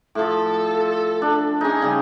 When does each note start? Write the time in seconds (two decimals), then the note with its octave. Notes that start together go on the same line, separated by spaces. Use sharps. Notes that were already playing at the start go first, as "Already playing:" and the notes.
0.15 A2 F3 A4
1.22 D4
1.61 C#4 D#4 G#4
1.82 C#3 G3